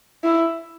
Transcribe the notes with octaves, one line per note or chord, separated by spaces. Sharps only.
E4